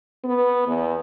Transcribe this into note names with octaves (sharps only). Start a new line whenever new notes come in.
B3
E2